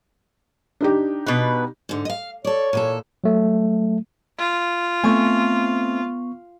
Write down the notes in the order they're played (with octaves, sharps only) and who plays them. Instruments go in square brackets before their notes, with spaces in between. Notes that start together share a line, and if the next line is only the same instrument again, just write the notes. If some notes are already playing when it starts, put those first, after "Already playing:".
[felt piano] D4 D#4 G4
[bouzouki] B2 B4
[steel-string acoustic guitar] G#2 D3
D#5 F5
[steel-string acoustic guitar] A4 D5 [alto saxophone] C#5
[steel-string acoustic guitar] A#2 E3 A4
[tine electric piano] F#3 A3
[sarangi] F4
[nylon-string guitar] A3 C4 G#5 [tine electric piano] B3 C#6